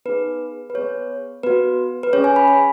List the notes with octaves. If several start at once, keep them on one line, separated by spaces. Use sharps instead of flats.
B3 D#4 G#4 B4
B4
B3 G#4 C#5
B3 F#4 B4
B4
C#4 G#4 C#5
G#5
B5
B5